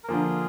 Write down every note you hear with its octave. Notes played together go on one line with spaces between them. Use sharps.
A#4
D3 F3 A#3 F4 G#4